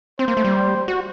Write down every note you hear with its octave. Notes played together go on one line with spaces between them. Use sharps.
C4 C5
A#3
A3
G3
F#4